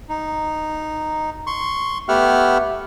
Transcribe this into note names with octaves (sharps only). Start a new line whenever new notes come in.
D#4
C6 C#6
A3 B3 G4 E5 F#5 F6